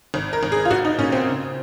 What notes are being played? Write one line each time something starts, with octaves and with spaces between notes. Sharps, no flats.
G#1
A#4
G#1
G#4
F4
A#1 F#4
D#4
A#2 C#4
C4
C#3